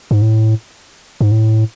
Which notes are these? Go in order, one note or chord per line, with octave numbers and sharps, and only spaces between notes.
G#2
A2
G#2
A2